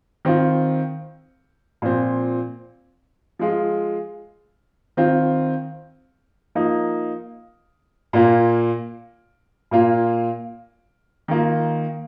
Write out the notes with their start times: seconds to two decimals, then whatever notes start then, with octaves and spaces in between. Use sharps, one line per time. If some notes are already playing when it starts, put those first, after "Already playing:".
0.25 D#3 C4 F4
1.82 A#2 F3 C4
3.39 F3 G#3 F4
4.97 D#3 C4 F4
6.55 F3 A#3 D#4
8.13 A#2 A#3 F4
9.71 A#2 A#3 F4
11.28 D#3 A#3 F4